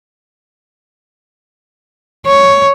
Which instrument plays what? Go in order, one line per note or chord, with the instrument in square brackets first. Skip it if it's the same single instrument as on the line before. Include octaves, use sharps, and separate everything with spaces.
[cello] C#5